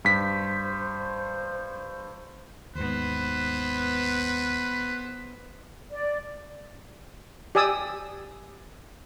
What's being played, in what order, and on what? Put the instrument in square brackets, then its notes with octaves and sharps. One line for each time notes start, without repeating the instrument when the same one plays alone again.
[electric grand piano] G2 B6 [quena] C5
[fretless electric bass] D#2 G#2 [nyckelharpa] B3 C5 [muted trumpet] B4
[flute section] D5
[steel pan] G4 D5 G#5 D#6 E6